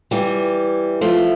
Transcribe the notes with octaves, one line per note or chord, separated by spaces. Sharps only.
E3 G3
F3 A3